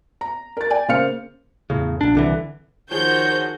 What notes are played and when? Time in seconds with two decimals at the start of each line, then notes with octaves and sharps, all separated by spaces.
0.21 A#5
0.57 A#4 A6
0.70 D5 G5 G#5
0.88 C#3 A#3 C5 F5 F6 C#7
1.70 E2 A2 C#3
2.01 A#1 D4
2.15 C2 D3 E3
2.91 D#3 F3 F#4 G#4 C5 C#5 G6